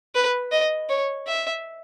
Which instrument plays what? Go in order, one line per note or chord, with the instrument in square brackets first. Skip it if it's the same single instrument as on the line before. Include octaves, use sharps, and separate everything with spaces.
[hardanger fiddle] B4
D#5
C#5
E5